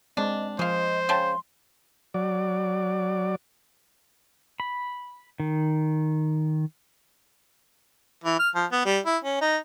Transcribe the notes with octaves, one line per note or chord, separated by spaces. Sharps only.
G#3 C4 D4 D#5
F3 G#3 C5 D#5 F5
C#3 G5 A5 C6
F#3 D5
B5
D#3
E3
F6
F3
B3
G3
E4
C#4
D#4